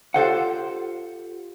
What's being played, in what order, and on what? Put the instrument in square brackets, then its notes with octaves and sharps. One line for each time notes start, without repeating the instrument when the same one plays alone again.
[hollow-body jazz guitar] F4 G4 A4 C5 F5 F#5